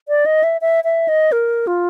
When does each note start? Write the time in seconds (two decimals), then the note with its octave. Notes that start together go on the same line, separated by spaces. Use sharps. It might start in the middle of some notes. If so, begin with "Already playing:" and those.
0.09 D5
0.26 D#5
0.43 E5
0.61 E5
0.84 E5
1.08 D#5
1.32 A#4
1.67 F4